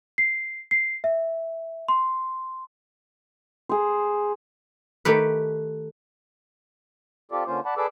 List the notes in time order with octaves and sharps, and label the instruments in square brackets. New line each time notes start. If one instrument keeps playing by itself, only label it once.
[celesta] C7
C7
E5
C6
[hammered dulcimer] G#4 C5
[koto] D#3 A3 G4 B4
[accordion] C4 F4 G4 A4 D5
D3 A#3 C#4 F4 C5
D5 F#5 A5 B5
G#4 A4 B4 D5 D6 E6